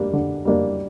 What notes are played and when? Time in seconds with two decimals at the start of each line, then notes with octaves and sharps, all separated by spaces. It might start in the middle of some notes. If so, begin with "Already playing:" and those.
Already playing: G3 A#3 D4
0.13 D3
0.45 G3 A#3 D4